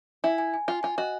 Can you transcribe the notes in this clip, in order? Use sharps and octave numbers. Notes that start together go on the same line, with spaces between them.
E4 G#5
G#5
G#5
F4 G#5
F4 G#5
F#4 D#5